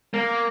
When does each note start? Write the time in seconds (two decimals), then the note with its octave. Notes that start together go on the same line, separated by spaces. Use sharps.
0.14 A#3